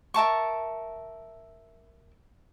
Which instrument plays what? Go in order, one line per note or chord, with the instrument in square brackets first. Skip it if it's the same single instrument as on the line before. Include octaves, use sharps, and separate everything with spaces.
[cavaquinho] A#4 E5 A5 C#6